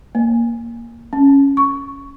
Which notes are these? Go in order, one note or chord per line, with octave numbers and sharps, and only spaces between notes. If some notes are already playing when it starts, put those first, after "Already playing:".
A#3
C#4
C#6